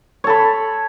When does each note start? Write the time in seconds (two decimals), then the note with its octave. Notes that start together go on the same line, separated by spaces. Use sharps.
0.24 C#5
0.27 A4
0.30 B5